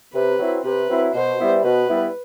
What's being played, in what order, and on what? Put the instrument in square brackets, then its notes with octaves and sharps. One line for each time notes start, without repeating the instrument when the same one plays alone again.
[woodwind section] C3 [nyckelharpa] B4
[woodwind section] F#3 C4 E4
[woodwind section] C3 [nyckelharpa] B4
[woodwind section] F#3 C4 E4
[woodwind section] B2 [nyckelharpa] C5
[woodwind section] G3 B3 E4
[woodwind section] B2 [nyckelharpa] B4
[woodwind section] G3 B3 E4